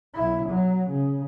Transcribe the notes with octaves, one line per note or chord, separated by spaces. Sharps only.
B1 E4
F#3
C#3